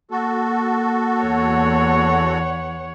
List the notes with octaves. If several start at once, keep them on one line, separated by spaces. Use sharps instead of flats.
A#3 F#4 A4
E2 C#5 F#5